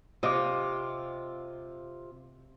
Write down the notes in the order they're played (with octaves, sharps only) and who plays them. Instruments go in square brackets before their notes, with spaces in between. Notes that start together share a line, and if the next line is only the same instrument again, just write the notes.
[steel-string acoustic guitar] C3 F4 [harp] D#5 D6